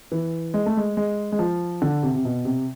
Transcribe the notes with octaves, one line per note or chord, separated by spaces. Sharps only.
E3
G#3
A3
G#3
G#3
G#3
F3
D3
C3
C3
B2
C3